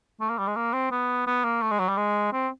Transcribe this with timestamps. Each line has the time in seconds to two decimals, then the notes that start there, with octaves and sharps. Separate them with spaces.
0.20 A3
0.29 A#3
0.38 G3
0.47 G#3
0.56 A#3
0.73 C4
0.91 B3
1.27 B3
1.44 A#3
1.62 A3
1.71 G#3
1.79 F#3
1.89 G3
1.97 G#3
2.33 C4